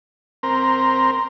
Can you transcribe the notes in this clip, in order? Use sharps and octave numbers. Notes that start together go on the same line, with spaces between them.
C4 A#4